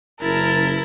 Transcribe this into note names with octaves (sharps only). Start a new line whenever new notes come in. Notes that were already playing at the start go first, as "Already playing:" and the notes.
F#1 E4 A#4 A5